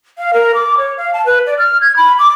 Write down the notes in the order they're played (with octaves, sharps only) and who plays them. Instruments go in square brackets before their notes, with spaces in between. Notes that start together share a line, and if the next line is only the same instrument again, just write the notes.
[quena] F5
A#4
D6
C#5
F5
A5
B4
D5
F6
G#6
B5
D6